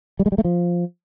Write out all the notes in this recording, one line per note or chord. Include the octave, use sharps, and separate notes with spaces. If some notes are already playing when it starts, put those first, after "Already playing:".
G3
G#3
G3
A3
F3